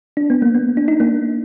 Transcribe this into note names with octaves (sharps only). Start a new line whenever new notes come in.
D4
B3
A#3
B3
D4
D#4
A#3 D4